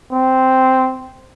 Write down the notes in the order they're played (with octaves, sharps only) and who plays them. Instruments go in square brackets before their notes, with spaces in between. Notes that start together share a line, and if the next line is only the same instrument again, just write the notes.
[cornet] C4